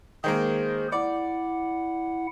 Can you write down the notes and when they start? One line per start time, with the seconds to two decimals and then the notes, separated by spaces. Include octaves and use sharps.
0.24 D#3 G#3 A#3 G#4 C5
0.92 E4 D5 F#5